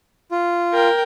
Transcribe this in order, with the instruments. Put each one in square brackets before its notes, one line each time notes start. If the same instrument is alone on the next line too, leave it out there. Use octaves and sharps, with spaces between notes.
[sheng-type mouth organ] F4
[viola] A#4 G5